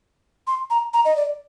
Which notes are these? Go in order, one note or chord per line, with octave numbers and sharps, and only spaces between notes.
C6
A#5
A#5
D#5
D5